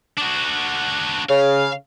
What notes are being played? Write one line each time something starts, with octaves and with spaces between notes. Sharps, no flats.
D4 F#4
C#3 F5